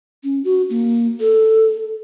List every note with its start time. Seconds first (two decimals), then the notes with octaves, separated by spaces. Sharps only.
0.24 C#4
0.44 F#4
0.70 A#3
1.20 A4